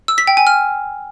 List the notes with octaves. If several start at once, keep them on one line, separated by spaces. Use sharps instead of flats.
E6
B6
G5
G#5
F6